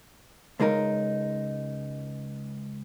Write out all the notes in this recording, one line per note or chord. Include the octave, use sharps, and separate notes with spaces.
C#2 G#3 D#4 A#4